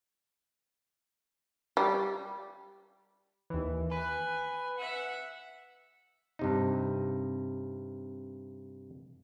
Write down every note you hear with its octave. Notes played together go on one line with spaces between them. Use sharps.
G3
D#2 E3
B4 G#5
E5 F#5
G2 C3 D#4